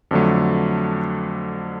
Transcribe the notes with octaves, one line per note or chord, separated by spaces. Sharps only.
F2 D3 F#3 A3